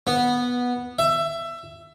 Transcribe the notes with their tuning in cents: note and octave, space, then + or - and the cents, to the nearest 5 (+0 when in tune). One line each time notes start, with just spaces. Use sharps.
B3 -10
E5 +20